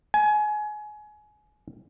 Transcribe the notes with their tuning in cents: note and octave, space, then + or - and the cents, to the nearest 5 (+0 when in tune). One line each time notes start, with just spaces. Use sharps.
G#5 +25